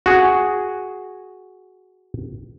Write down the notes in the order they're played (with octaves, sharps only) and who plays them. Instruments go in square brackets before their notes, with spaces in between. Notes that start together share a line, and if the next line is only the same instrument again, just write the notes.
[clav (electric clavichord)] F#4 G#4